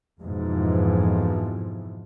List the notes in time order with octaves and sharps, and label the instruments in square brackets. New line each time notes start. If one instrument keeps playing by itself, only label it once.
[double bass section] F2 G#2 B2 E3 F3